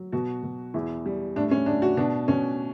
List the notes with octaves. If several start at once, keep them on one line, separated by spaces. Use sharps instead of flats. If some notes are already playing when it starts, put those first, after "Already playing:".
Already playing: F#3
B2 F#4
B2
E2 E4
G3
A2 D4
C#4
A2 D4
F#4
B2 D4
B2 C#4